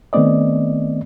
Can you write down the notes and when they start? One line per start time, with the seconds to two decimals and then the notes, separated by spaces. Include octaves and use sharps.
0.13 D#3 A3 B3 C4 D5 D#5